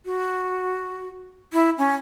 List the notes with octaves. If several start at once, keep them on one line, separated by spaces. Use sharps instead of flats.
F#4
E4
C#4